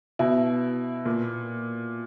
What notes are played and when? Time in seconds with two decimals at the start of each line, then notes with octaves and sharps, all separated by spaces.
0.19 B2 E4
1.05 A#2